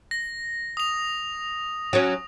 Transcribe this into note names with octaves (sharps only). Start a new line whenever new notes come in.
A#6
D#6 F7
F#3 C#4